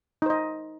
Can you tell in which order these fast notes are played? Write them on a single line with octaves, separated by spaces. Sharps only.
D#4 C5 D#5